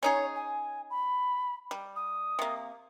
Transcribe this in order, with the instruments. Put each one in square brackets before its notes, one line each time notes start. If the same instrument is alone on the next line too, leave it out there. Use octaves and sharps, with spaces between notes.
[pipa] C#4 D#4 G#4 [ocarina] C#5
[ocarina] G#5
B5
[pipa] G3
[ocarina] D#6
[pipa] C3 A#3